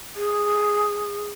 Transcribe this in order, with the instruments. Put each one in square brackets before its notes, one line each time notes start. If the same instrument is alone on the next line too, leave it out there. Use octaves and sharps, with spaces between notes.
[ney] G#4